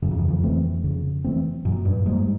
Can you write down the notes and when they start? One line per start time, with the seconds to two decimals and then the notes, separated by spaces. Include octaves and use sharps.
0.02 F#2 C#3
0.11 F2
0.19 E2
0.28 F2
0.43 E3 A3 C4
0.84 C#3
1.24 E3 A3 C4
1.65 F#2 A#2
1.85 G2
2.06 G#2 G3 A#3